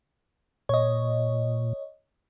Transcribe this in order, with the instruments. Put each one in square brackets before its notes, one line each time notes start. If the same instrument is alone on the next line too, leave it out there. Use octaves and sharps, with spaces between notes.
[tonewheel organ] A#2 [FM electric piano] C#5 D#5